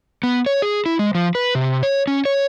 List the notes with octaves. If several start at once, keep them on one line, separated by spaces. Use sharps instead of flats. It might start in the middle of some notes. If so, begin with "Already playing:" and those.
B3
C#5
G#4
E4
G#3
F3
B4
C3
C#5
C#4
C#5